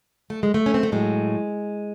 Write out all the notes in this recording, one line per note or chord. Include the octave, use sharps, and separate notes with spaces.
A3
G#3
A3
C#4
C4
A3
A2 F#3 G#3